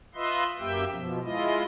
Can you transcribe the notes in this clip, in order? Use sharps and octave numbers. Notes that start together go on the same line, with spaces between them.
F4 B4 D#5 E5 C6
F#2 A#3 G4 E5 G5
B2 F3
G#3 E4 F4 D#5